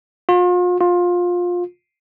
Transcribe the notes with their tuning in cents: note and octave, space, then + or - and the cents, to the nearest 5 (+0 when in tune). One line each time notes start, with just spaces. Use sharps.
F4 +40
F4 +20